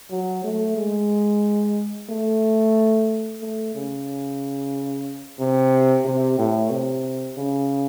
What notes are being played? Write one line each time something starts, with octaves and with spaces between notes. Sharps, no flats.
F#3
A3
G#3
A3
A3
C#3
C3
C3
A2
C3
C#3